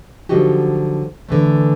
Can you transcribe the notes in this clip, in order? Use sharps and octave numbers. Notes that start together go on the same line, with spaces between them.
D3 F3 F#3 D#4 F#4 G4
D3 E3 A3